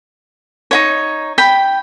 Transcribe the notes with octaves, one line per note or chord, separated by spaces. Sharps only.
D#4 E4 C#5
G5 B5